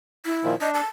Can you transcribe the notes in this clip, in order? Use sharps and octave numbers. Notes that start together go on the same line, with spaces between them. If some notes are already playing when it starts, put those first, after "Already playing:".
E4
A#2 D#3 F3
D4 D#5
A5